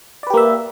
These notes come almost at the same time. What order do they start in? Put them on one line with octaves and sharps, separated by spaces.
D5 B4 G4 A#3 E5